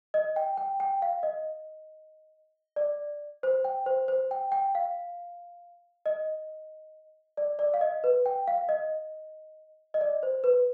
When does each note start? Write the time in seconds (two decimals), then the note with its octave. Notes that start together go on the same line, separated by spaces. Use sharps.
0.14 D#5
0.36 G5
0.57 G5
0.80 G5
1.02 F5
1.23 D#5
2.76 D5
3.43 C5
3.64 G5
3.86 C5
4.08 C5
4.31 G5
4.52 G5
4.75 F5
6.06 D#5
7.37 D5
7.59 D5
7.74 F5
7.81 D#5
8.04 B4
8.26 G5
8.48 F5
8.69 D#5
9.94 D#5
10.01 D5
10.23 C5
10.44 B4